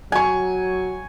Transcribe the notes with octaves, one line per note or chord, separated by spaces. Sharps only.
F#3 G#5 C#6